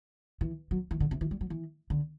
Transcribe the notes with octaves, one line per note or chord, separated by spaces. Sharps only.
E3
F#3
E3
D3
C3
E3
G3
F#3
E3
D3